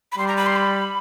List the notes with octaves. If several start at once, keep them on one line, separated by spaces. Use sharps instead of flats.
B5
G3 C6
A#5
B5
C6
B5